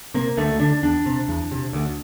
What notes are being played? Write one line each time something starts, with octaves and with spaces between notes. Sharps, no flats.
C3 A#3
D2 A3
D3 D4
E2 D4
C3
E2
C3
D2